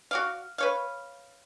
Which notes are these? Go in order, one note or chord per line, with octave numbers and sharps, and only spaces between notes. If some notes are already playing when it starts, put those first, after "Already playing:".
F#4 D5 F5
B4 C#5 F5